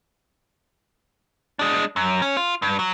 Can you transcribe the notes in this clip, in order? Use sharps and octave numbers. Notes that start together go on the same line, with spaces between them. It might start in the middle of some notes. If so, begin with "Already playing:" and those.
G#3 D4
F#2
C#4
F4
G2
F#3